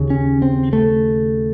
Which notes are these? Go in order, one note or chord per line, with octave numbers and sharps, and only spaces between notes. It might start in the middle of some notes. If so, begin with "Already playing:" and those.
Already playing: D#2 C#3
C#4
C4
A3